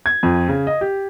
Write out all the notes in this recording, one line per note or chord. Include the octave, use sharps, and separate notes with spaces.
G#6
F2
C#3
D#5
G4